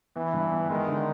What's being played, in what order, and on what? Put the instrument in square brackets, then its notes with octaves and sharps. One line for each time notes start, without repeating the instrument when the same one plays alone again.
[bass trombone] E3 [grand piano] B3
[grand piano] G2
B3
[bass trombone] D#3 [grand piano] G#3
[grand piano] D3